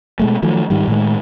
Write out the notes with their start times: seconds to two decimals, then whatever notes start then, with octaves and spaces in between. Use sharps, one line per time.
0.20 B2 G#3 A3
0.42 D#3 F3 F#3 A3
0.70 G#2 D#3 G3
0.88 A2 D#3 G#3